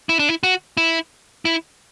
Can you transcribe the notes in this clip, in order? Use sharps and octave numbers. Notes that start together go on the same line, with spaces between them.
E4
D4
E4
F#4
E4
E4